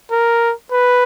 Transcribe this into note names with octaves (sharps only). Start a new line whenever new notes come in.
A#4
B4